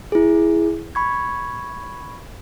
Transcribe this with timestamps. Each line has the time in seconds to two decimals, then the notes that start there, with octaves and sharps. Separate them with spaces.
0.12 E4 G#4
0.95 B5 C#6 G#6